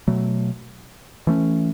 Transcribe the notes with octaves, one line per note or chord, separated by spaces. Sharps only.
B2 F#3 A3
E3 A3 C#4